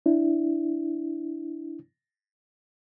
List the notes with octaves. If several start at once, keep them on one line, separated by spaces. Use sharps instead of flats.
D4 E4